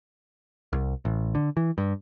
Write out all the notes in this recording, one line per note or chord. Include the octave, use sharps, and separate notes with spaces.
C2
A1
D3
E3
G2